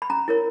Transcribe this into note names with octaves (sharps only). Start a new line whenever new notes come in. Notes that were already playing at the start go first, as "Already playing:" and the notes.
B5
C#4 A#5
E4 A#4 C#5